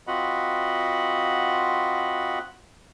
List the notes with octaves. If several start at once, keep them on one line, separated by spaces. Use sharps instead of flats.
C4 F4 F#4 D#5 F#5 B5